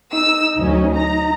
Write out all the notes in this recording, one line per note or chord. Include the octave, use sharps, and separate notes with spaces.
D#4 E6
D2 F#3 C#4
A#5